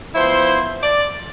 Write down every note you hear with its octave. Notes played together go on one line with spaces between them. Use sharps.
F3 B3 E4 C5
D5